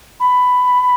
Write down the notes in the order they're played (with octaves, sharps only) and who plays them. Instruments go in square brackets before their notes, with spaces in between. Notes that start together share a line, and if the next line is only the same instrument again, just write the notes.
[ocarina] B5